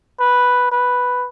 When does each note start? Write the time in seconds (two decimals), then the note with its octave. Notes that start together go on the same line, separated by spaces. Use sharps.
0.20 B4
0.72 B4